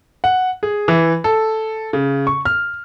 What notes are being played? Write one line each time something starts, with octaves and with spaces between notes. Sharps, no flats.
F#5
G#4
E3
A4
C#3
C#6
F6